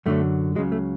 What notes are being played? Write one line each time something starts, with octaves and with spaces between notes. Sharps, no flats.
F#2 D3 F#3 A3
C#2 C#3 F#3 G#3
A3